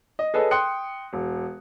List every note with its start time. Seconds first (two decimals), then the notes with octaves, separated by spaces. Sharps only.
0.19 D#5
0.34 G#4 A4 B4 C#5 D#5
0.51 G5 C6 D#6 F#6 C#7
1.13 E1